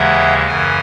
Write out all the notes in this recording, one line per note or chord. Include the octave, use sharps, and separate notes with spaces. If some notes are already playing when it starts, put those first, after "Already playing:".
Already playing: D#2 C#3 E3 G#3 E5 F#5
F#2 C#3 E3 F#5 G#5